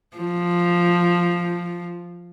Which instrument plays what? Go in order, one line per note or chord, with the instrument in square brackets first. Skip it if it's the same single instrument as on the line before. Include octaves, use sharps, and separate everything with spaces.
[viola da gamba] F3